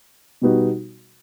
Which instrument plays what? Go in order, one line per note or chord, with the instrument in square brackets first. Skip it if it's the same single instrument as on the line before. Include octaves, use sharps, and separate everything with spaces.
[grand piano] B2 G3 B3 D#4 F#4